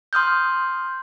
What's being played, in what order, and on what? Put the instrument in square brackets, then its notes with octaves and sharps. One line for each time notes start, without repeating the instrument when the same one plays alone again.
[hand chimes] C6 D#6 F6 G6